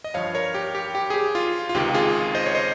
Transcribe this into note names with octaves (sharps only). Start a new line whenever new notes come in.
D#5
G2 F3 C#5 F5
A#4 C#5
G4
G4
G4
G#4
G4
F4
F4
C#2 C3 D#3 G4
F4 G#4
C5 D#5
C#5
C5 D#5